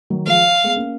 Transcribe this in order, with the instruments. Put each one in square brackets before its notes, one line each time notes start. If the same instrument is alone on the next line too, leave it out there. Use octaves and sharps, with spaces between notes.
[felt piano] D#3 F#3
[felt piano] F3 G#3 [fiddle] F5
[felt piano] G#3 B3
A#3 C#4